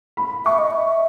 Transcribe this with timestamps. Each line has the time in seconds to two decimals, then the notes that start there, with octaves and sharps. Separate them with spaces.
0.17 B5
0.45 E5 C#6
0.58 D#5
0.71 E5